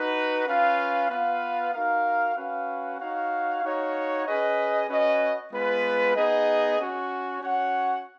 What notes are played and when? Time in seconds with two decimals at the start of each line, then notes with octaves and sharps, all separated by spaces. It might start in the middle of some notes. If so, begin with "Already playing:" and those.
Already playing: D#4 F#4 B4
0.47 C#4 F4 B4 F5
1.10 B3 F4 B4 F5
1.73 D#4 F#4 A#4 F5
2.36 C#4 F#4 B4 F5
2.99 D#4 F#4 C#5 F5
3.62 D#4 F#4 C#5 F5
4.26 C#4 G#4 B4 D#5
4.89 C#4 F#4 B4 D#5
5.52 G#3 B3 F4 B4
6.15 B3 D#4 G#4 D#5
6.79 C#4 F#4 C#5
7.41 C#4 F#4 C#5 F#5